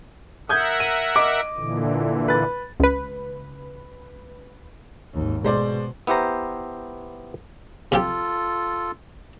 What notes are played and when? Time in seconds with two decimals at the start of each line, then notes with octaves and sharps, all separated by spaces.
0.49 A#4 E5 F#5 D#6 G6 G#6
0.80 D#7
1.16 D#5 D6
1.56 A#2 D3 E3
2.28 B4 A6
2.80 C#2 B4
5.14 G#1 D#2
5.44 B2 G#3 C5 D5
6.07 B3 E4 G4 C5 A#5
7.92 C3 F3 F4 G4 A4